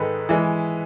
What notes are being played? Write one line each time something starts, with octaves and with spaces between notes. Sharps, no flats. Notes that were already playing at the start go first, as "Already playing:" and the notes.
Already playing: G#2 D#3 G#3 A4 B4
E3 G#3